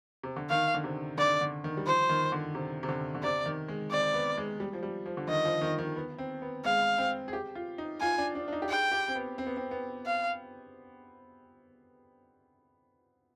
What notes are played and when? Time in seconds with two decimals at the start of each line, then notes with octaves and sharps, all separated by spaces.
0.23 C3
0.36 D3
0.50 D#3 F5
0.74 D3
0.84 C3
1.18 D3 D5
1.41 D3
1.64 D#3
1.77 G3
1.87 F3 C5
2.09 D#3
2.32 D3
2.55 C3
2.83 C3
2.89 D3
3.15 D3
3.23 C3 D5
3.46 D#3
3.68 G#3
3.91 C4 D5
4.14 B3
4.37 G#3
4.60 G3
4.73 F3
4.83 G3
5.06 F3
5.17 D3
5.28 D#3 D#5
5.45 F3
5.62 D#3
5.79 D#3
5.96 B3
6.18 C4
6.42 B3
6.65 G#3 F5
6.98 C4
7.28 G#4
7.33 G4
7.55 F4
7.78 D#4
8.01 F4 G#5
8.18 D4
8.35 D4
8.48 D4
8.53 D#4
8.62 G4
8.69 G#4 G5
8.91 G4
9.08 C4
9.15 B3
9.38 C4
9.47 B3
9.57 C4
9.71 B3
10.06 F5